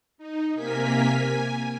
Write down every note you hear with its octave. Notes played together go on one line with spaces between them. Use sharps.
D#4
C3 A#3 A#4 G#5 B6
G#5